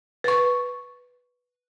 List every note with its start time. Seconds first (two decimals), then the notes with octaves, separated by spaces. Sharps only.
0.24 B4 C#6